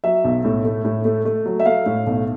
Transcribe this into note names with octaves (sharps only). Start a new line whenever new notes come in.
F#3 E5
B1
A2
A3
A2
A3
A3
F#3
E5
A3 F5
A2
B1